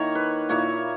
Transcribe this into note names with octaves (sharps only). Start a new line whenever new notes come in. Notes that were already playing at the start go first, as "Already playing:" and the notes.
Already playing: D#3 A#3 E4 C#5
B4
A#2 A#3 E4 C#5